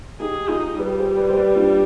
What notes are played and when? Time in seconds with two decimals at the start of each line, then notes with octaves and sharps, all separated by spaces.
0.20 D#4 G4 G#4
0.49 D#4 F4 G#4
0.78 G3 G4 B4
0.98 G#4 C5
1.17 B4 D5
1.29 C5
1.37 B4 D5
1.56 D4 F4